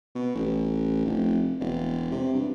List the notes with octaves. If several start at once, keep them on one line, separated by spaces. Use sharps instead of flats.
B2
A1
F1
E1
C3
G2